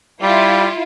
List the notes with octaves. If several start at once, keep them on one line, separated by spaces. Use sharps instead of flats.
G3 E4 F4